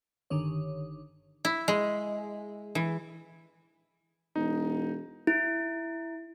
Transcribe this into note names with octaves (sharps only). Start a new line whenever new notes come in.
G1 D3 D#3 C#5
E4
G#3
E3
E1 D#4
E4